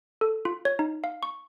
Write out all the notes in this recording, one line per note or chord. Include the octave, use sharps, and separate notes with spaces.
A4
F4
C#5
D#4
F5
C#6